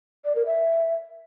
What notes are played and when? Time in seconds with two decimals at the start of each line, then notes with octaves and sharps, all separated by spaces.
0.24 D5
0.35 A#4
0.46 E5